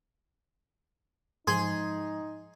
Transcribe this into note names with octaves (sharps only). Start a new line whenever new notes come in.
G#2 F3 D#4 G#4 C6